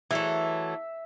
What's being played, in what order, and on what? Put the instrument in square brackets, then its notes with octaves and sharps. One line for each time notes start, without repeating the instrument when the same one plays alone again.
[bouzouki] E3 F#3 A3 [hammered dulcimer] E5